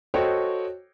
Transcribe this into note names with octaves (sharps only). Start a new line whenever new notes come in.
F#4 A4 C5 C#5 D#5 G5